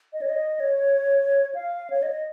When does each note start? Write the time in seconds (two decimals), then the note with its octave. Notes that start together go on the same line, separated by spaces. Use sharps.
0.13 D#5
0.21 C#5
0.29 D#5
0.60 C#5
1.55 F5
1.90 C#5
2.03 D#5